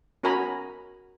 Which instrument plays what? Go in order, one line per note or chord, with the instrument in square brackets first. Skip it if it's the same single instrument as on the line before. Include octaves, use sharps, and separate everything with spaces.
[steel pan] C#4 F#4 A#4 G#5 A#5 B5